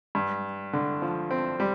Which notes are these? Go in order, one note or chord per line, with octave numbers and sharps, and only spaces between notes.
G2
D3
F3
C4
G3